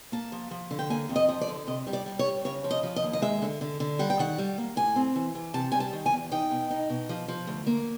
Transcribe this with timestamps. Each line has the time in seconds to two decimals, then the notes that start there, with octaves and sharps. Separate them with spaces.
0.12 A#3 A5
0.32 F3
0.51 F3
0.71 D3
0.79 G5
0.90 A#3 G#5
1.09 F2
1.16 D#5
1.29 F3
1.41 D5
1.48 D3
1.67 C3 D#5
1.87 G3
1.93 D5
2.06 G3
2.19 C#5
2.25 G3
2.45 C#3 C#5
2.64 F3
2.71 D#5
2.83 F3
2.96 D#5
3.03 D#2
3.13 D#5
3.22 G#3 E5
3.42 D3
3.61 D3
3.80 D3
3.99 G3 F#5
4.10 G5
4.19 D#3 F#5
4.38 G3
4.58 A#3
4.76 A2 G#5
4.96 C4
5.16 E3
5.35 E3
5.54 C3 A5
5.72 G3 G#5
5.80 A5
5.93 D#3
6.06 G#5
6.12 E2
6.32 D#4 G5
6.51 B2
6.71 D#4
6.90 B2
7.09 F3
7.28 F3
7.47 D2
7.67 A#3